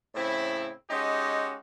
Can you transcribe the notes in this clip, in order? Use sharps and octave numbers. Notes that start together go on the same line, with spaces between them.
A2 C#3 C4 E4
G#3 C#4 D#4 F#4 G4